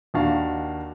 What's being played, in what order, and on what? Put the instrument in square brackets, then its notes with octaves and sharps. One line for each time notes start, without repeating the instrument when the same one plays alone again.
[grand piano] D#2 D#3 D4 F#4 F5